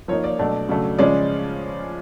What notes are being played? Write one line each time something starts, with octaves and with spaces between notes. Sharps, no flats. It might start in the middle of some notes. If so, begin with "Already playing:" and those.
F3 A#3 D#4 C#5
D5
B2 F#3 A3 D4
C#3 F#3 A3 D4
C#3 F3 G#3 C#4 D5